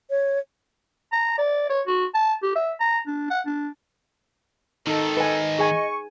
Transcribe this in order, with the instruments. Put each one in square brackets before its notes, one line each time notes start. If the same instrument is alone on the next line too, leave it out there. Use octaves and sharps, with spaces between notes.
[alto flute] C#5
[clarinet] A#5
D5
C#5
F#4
A5
G4
E5
A#5
D4
F#5
D4
[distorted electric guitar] G#2 D#3 [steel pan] D#4 [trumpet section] A4
[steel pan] B4 G#5 [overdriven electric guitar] D#5
[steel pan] G#4 G#5 [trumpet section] C#6